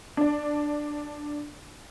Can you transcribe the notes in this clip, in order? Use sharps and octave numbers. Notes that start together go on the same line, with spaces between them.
D4 D5